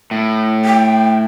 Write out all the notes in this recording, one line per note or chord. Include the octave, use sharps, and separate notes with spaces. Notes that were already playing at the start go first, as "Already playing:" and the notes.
A2
G5